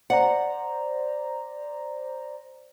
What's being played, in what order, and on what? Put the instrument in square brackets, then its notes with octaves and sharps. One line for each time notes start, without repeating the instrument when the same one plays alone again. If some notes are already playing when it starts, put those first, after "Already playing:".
[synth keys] C5 D5 A#5 [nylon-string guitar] F#5